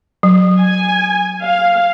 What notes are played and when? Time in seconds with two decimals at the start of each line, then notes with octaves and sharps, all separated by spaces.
0.23 F#3
0.58 G#5
1.42 F5